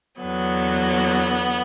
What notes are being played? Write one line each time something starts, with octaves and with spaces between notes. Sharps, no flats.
E2 D3 F#3 B3